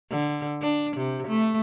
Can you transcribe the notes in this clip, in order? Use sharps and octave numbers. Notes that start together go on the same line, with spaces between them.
D3
D4
C3
A3